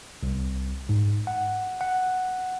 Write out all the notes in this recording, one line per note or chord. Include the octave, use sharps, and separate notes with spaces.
C2
G#2
F#5
F#5